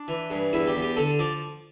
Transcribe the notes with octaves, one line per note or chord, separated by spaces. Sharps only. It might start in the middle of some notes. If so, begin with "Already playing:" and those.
Already playing: D4
E3
G2
E2 E4
G4
E2
G4
D3 A4
F3 D5